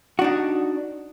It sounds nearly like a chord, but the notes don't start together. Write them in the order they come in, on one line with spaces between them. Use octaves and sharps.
F#4 D4 D#4